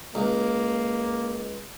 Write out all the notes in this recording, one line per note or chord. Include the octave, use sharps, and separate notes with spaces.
C#2 A#3